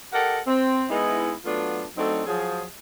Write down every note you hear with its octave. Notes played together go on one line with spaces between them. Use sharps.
G4 A4 A#4 D#5 F#5
C4
G#3 B3 D#4 E4
F#3 A3 B3 D4 F4
F#3 A3 C4 D4 D#4 A4
F3 F#3 G#4